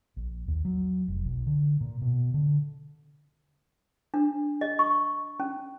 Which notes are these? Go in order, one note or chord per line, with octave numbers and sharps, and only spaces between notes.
A#1
D#2
F#3
F1
B1
D3
A#2
B2
D3
D4
D#5
C#6
C#4